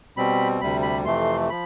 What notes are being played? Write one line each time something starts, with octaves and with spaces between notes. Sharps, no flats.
B2 G3 C4 B5
D2 C3 G3 B5
B5
F2 C3 E3 A3 C6
F3 B5